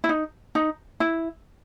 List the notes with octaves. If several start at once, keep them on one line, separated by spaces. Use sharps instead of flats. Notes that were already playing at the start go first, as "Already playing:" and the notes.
E4
D#4
D#4
E4